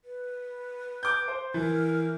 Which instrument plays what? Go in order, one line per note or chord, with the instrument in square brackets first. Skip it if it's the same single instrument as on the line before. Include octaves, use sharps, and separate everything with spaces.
[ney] B4
[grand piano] D6 G6
C5
[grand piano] E3 [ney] A#4